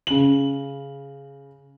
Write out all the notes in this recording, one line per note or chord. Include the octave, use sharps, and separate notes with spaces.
C#3 F#7